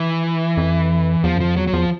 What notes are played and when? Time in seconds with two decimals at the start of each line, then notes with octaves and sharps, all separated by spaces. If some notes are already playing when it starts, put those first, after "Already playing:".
Already playing: E3
0.57 F2
1.24 E2 F3
1.36 F#2
1.40 F2 F3
1.56 E2 F#3
1.67 F#3
1.73 E2 F3